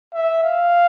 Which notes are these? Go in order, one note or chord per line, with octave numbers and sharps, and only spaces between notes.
E5
F5